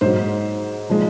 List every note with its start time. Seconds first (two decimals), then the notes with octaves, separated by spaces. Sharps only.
0.01 G#2 F#3 C5
0.90 F3 G#3